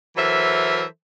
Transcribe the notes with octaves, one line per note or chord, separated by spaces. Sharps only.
E3 F#3 A4 A#4 C5 E5